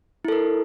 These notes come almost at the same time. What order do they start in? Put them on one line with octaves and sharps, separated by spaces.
E4 A4 A#4